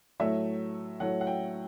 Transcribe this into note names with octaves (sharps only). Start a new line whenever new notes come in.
A2 F#3 A3 E5
A2 F#3 A3 F#5
F#5
G5